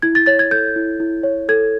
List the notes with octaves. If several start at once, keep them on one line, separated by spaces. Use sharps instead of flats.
E4 G#6
A6
C#5 A6
G#6
A4 G6
E4
E4
C#5
A4 G#6